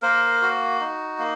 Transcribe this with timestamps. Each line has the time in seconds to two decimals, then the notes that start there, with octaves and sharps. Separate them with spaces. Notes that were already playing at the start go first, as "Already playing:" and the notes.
0.02 A#3 A#4 C5
0.42 F#4
0.80 D#4
1.19 A#3